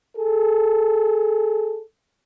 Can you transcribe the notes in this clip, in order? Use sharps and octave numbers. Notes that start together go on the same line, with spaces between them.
G#4 A4